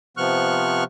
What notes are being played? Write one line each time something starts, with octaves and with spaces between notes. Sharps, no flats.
C3 F3 B3 C#6 F6 F#6